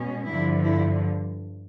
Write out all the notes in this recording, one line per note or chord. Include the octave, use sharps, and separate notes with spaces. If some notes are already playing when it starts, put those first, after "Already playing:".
Already playing: B2 G#3 C#4
G2 D3 F3 E4
E4